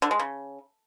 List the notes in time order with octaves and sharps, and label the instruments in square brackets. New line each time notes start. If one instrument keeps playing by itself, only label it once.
[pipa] D3
G#3
C#3